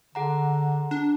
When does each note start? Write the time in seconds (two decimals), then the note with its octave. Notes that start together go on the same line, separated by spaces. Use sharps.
0.15 D3 G#4 F#5 A#5
0.91 D4